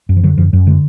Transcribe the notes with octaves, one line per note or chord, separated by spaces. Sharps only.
F#2
F3
D3 F#3
F#2 F3
F#2 F#3
D3 G#3